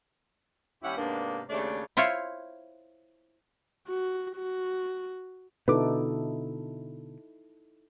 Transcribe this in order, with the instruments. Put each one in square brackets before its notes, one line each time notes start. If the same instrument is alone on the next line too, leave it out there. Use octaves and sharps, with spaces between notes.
[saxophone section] D#2 G3 C#4 E4 G4 F#5
G#2 C3 A#3 B3 D4
D#2 C#3 A3 D4 C#5 D5
[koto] E4 F4 C5 C#5
[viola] F#4
F#4
[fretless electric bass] B2 D3 [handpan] D#4 E4 A4 [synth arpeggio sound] B4 D6